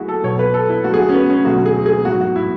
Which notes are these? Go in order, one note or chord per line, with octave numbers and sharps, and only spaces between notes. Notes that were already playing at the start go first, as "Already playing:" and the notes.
Already playing: D2 F#3 E4 F#4 G#4
A4
B1 B2 F#3 C#5
B4
A4
E4
D2 D3 F#3 F#4
G#4
F#4
C#4
B3
C#4
E1 D2 D3 F#3 F#4
G#4
G#4
A1 G#2 F#3 F#4
F#4
E4